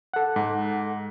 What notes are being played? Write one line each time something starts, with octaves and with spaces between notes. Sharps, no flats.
A4 F#5
G#2